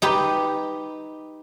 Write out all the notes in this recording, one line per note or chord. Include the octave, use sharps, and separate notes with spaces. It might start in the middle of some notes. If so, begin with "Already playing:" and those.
D#4 G4 B4